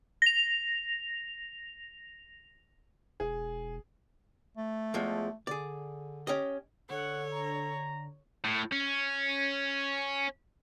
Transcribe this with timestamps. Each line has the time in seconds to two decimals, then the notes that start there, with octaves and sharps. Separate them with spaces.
0.22 A#6 F7
3.20 E1 G#4
4.57 A3
4.94 E2 F3 G#3
5.47 D3 G#4 D5
6.27 C#4 G4 D#5
6.90 D3 A4 C#5 F#5
7.32 A#5
8.44 A2
8.72 C#4